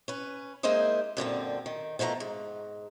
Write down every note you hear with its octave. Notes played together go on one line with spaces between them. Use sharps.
C#4 B4
G#3 A#3 D#4 E4 C5 D#5
F#2 A#2 D3 C4
D#3
B2 F3 A3 A4 A#5
G#2